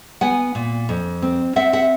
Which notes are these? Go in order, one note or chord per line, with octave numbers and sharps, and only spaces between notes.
B3 F#5 G#5
A#2
F2
C4
C4 E5 F#5
E5 F#5